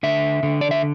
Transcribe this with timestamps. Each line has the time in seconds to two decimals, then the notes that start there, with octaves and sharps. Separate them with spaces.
0.03 D3 E5
0.43 D3
0.61 D5
0.71 E5